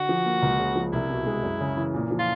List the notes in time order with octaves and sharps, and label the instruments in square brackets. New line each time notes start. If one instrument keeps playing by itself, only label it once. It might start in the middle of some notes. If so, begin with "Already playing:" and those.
Already playing: [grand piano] D3 [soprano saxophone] F#4
[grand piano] F3
A#3
C#2
C#3
F3
[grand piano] C2 [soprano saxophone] E4
[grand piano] B2
G#3
F#2
C#3
E3
A#2
F3
[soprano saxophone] F4